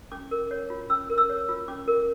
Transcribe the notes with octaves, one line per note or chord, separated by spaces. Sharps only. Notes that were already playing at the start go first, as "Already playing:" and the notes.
C#4 D6
A#4
C#5
F4
C#4 E6
A#4
E6
C#5
F4
C#4 D6
A#4